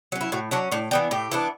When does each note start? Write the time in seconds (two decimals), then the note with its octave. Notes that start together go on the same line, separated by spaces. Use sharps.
0.12 F#3 C#4
0.21 E4
0.32 A2 F#4
0.51 F#3 C#4 D4
0.72 A2 D4
0.91 E3 B3 D4 G4
1.11 A2 G4
1.31 E3 B3 D4